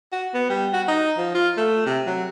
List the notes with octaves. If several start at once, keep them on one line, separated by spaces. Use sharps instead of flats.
F#4
B3
G3
F#4
D#4
F3
F4
A3
C3
F#3